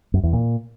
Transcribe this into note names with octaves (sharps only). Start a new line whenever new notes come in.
F#2
E2
A#2